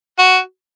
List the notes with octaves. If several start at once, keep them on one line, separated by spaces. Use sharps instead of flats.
F#4